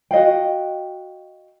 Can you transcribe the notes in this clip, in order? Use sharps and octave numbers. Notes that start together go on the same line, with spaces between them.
F#4 D#5 F5 G5